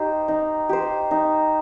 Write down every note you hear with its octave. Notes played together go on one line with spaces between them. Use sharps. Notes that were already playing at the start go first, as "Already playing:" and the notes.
Already playing: D#4 G4 C5
D#4
G4 C5
D#4